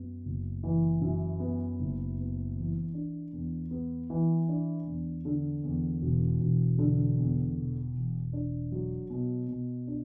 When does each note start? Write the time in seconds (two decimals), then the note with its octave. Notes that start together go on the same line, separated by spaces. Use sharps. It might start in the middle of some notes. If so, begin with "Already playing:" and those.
Already playing: F#2 B3
0.25 F#1
0.64 E3
1.01 F#2
1.40 B3
1.79 F#1
2.18 B3
2.56 E3
2.94 D4
3.33 E2
3.71 B3
4.10 E3
4.49 D4
4.87 E2
5.25 D3
5.64 E2
6.02 E1
6.40 E1
6.78 D3
7.18 E2
7.56 E1
7.95 E1
8.33 D4
8.72 F#3
9.10 B2
9.48 B2
9.87 D4